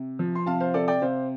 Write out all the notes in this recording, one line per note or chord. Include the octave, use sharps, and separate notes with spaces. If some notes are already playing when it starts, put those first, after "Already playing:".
Already playing: C3
F3
C6
C3 F5 A5
C5 F5
C3 A4 D5
D5 G5
C3 C5 F5